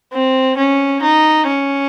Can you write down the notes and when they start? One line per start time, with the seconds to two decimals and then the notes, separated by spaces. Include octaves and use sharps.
0.13 C4
0.57 C#4
1.02 D#4
1.47 C#4